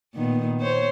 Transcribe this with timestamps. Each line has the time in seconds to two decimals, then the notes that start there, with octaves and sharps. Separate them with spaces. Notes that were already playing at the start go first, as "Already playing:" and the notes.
0.15 A#2 D#3 B3
0.61 C5 C#5